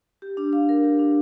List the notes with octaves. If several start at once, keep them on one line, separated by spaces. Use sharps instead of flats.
G4
D4
F5
A#4
G4
D4